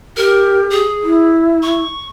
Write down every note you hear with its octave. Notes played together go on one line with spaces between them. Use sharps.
G4 A#4
G#4
E4
C#6